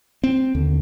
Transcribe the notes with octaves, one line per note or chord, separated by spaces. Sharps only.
C4
D#2 D3